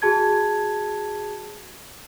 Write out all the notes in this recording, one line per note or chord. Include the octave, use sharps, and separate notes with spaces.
F#4 G#4 A5 G#6